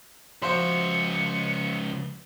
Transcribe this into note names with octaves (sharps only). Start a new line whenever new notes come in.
C#2 F3 F#4 C5 E5 C6 C#7